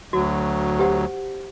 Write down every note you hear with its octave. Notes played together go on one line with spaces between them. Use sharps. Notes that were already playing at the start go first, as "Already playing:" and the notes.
D2 F#3 F#4
G4 C5 F#5